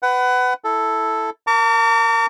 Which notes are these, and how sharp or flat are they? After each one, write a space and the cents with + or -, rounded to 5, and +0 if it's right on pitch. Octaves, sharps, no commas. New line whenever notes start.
B4 +20 F#5 +25
E4 +0 A4 +0
A#4 +0 A#5 -45 D6 -40